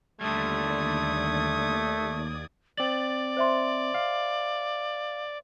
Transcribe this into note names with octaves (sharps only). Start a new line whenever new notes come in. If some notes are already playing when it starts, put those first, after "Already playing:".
D#2 D3 G3 A3 D5 D#6 G#6
C4 D5 A6 F#7
C5 E5 C6
F5